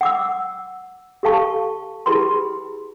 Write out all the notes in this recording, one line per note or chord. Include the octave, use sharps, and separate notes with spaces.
F#5 D6 E6
G4 A4 F5 A5 C#6
E4 G4 G#4 B4 B5 C6